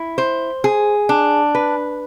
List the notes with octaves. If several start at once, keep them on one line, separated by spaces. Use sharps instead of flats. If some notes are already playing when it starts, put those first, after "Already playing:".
Already playing: E4
C5
G#4
D4
B4